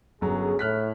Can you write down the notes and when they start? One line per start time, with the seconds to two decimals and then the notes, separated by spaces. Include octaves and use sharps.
0.21 G1 F#3 C#4 G#4 A#5
0.59 A2 F6 F#6 B6